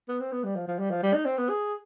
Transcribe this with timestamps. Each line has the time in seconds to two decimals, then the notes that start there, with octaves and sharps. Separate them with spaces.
0.09 B3
0.20 C4
0.32 B3
0.44 G3
0.56 F3
0.68 F3
0.79 G3
0.90 F3
1.03 G3
1.14 D#4
1.26 C4
1.38 B3
1.50 G#4